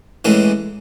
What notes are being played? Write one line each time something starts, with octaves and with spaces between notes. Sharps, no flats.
A1 A2 E3 G#3 C#4